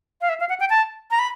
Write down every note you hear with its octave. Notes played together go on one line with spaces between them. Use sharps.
F5
E5
F5
F#5
G5
A5
A#5
B5